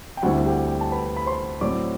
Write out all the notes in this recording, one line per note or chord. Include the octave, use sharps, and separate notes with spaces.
G5
D2 D3 G3 C4 E4 F#4 F#5
G4 G5
G5
A5
B4 B5
B5
C5 C6
A2 F#3 C4 D5 D6